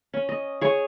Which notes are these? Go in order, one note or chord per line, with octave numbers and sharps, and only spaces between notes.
C#4
D#5
G#4 C#5